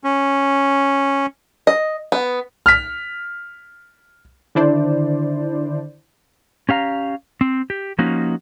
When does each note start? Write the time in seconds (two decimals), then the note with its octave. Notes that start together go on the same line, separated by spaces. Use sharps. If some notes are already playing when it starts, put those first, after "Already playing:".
0.04 C#4
1.67 D#5
2.12 B3
2.66 F6 B6
4.55 D3 D#3 D4 E4 C5 D5
6.69 C#4 G4 F5 A#5
7.41 C4
7.70 G4
7.99 F3 A#3 C#4 D#4 F#4